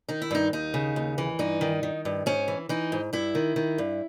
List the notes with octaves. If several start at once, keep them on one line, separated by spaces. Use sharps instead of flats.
D#3 D#4
E4
G2 D#4
D#2 D#4
C#3
D#2
E3
G2 D#4
D#3
D#3
G2
G#2 C#4
E3
E3 D#4
G#2
G2 E4
D#3
D#3
G2